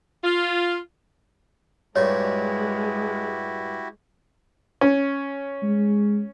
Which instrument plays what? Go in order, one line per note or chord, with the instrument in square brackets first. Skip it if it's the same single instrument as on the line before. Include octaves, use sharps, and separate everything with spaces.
[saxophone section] F4
[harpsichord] G2 A#2 C#6 [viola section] G#3 [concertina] E4 F#4 G4 [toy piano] C#5
[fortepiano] C#4
[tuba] G#3